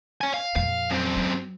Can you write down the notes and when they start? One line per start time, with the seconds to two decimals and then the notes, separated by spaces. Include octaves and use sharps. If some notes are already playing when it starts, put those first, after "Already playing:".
0.21 C#5 G#5
0.34 F5
0.56 F2 A#2 F5
0.90 F#2 C4
1.16 F#3